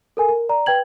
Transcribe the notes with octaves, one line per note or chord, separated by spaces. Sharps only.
A4 A#4 G#5
A#4
D5 A#5
B4 G5 G#6 F#7